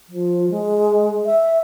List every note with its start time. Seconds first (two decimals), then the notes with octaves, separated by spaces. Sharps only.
0.09 F3
0.50 G#3
1.26 E5